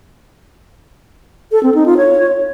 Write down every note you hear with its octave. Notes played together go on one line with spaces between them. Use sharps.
A4
C4
D#4
F4
C#5